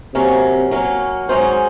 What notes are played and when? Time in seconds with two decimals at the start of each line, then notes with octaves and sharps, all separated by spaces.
0.15 C3 F#3 A#3 C#4
0.71 F#3 A#3 C#4
1.29 G#2 F#3 C#4 G#4 C5